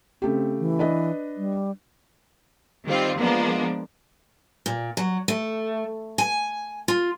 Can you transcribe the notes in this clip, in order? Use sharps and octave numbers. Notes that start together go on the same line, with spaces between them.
C#3 A3 C4 G4
E3
D4 B4 D#5
G3
D#3 G3 C4 F4
F3 G#3 A#3 B3 D4
A#2
F#3
A3
G#5
F4